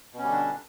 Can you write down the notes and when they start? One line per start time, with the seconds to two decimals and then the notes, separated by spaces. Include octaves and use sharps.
0.13 B2
0.18 C#4
0.23 G3
0.27 D3
0.32 D4